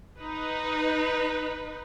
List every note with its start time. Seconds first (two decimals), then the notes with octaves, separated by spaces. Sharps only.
0.20 D#4 B4